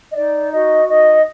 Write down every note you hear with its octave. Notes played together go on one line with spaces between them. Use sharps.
D#5
D#4 D5
F#4 D#5
D#4 D#5